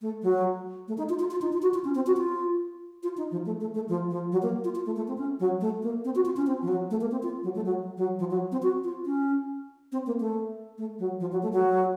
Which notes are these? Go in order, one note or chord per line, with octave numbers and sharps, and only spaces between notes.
A3
F#3
A3
D#4
F4
F4
F4
D#4
F4
F#4
F4
C#4
C4
F#4
F4
F4
D#4
F3
A3
A3
A3
F3
F3
F#3
A#3
F4
F4
A3
A3
C4
C#4
F#3
A3
A#3
C4
F#4
F4
C#4
C4
F3
F#3
A3
A#3
C4
F4
F#3
A3
F#3
F#3
F3
F#3
C4
F#4
F4
C#4
C4
A#3
A3
A3
F#3
F3
F#3
A3
F#3